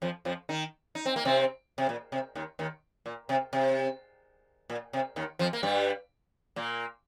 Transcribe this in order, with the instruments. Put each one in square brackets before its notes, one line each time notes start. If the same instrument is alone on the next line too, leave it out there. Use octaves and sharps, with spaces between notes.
[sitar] F2 F3
F2 F3
D#3 D#4
D#4
C4
A#3
C3 C4
C3
A#2
C3
D#2 D#3
D#2 D#3
A#2
C3
C3
A#2
C3
D#2 D#3
F2 F3
A#3
G2 G3
A#2 A#3